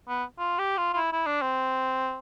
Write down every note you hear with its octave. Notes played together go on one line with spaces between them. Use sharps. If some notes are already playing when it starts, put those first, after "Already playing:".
B3
F4
G4
F4
F4
E4
E4
D4
C4